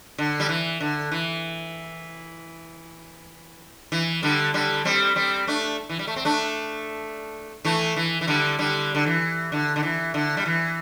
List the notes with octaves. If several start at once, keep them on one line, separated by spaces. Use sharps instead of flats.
D3
G3
E3
D3
E3
E3
D3 G3
D3 G3
G3 C4
G3 C4
A3 D4
E3
G3
A3
C4
A3 D4
E3 A3
E3
E3
D3 G3
D3 G3
D3
E3
D3
D3
E3
D3
G3
E3